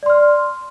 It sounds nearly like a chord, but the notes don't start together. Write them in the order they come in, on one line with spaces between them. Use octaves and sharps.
D5 C6 F6